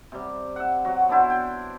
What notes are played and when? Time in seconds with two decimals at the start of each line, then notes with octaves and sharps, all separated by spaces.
0.12 C3 G3
0.56 E5 F#5
0.85 F#3 F#4
1.09 B3 D4 E4 C5
1.30 G5 C6